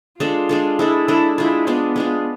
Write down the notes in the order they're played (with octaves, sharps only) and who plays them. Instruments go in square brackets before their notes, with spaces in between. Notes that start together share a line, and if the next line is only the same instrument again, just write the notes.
[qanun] G#3 D4 A4 [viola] F4
[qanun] G#3 D4 A4
[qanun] G#3 D4 A4 [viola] E4
[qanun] G#3 D4 A4 [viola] E4
[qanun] G#3 D4 F4 [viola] E4
[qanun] G#3 D4 F4 [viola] B3
[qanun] G#3 D4 F4